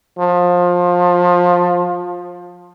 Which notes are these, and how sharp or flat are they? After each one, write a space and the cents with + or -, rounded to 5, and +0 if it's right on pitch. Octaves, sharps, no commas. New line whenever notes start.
F3 +20